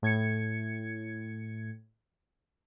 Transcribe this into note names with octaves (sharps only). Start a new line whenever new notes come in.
A2 G#6 C#7